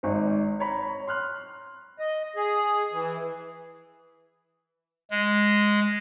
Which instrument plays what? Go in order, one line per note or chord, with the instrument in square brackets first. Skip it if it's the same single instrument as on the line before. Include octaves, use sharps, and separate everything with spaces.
[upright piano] G#1 D#4 C5
C#5 A#5 B5
C6 F6 F#6
[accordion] D#5
G#4
E3
[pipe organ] G#3